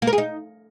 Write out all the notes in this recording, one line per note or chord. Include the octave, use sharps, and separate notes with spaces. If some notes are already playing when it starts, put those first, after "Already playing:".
A#3
A#4
G#4
D#4